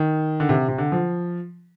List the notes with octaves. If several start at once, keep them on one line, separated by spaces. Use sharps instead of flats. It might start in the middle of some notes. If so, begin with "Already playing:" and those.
Already playing: D#3
D3
C3
C3
D3
F3